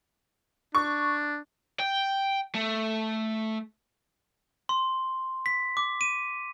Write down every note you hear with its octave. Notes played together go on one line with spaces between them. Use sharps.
D4 C#6
G5
A3
C6
B6
D6
D#7